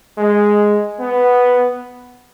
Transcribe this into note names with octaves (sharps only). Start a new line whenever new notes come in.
G#3
B3